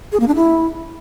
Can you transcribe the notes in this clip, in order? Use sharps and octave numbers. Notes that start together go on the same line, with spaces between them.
G#4
A#3
D4
E4